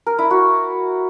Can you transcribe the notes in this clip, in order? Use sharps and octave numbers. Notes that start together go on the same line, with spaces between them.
A#4
E4
F#4